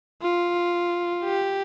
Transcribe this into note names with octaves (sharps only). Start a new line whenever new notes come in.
F4
G4